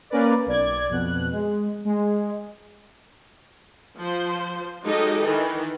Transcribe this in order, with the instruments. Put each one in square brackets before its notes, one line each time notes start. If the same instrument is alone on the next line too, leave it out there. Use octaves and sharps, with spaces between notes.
[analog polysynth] A#3 C#4 A#4 B4 D5
B1 D5 G#6
F2 B2 F#6
G#3
G#3
[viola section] F3 C5
F#3 G#3 D#4 G4 A4 D#5
D#3 E3